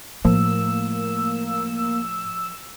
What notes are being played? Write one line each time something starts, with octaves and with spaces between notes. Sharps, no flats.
A2 F3 A#3 E6